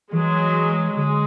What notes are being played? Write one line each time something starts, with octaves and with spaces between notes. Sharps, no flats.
E3 F#3 G#3
D3 G#3